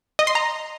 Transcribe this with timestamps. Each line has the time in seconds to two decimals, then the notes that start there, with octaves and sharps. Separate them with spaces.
0.19 D#5
0.27 C6
0.35 A#5